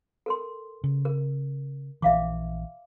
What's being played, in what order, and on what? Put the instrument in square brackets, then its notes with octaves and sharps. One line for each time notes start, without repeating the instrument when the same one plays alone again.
[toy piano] A4 A#4 C6
[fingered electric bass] C#3
[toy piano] A#4
[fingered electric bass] A#1 E3 [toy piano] E5 F5 D6